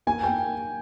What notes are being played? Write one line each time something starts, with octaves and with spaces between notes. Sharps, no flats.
A#3 G#5
A#3 G5